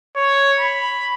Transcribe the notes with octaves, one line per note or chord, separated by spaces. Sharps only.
C#5
B5